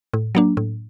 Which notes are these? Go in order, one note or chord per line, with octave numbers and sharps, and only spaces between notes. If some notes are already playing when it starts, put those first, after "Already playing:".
A2
F#3 A#3 D4
A2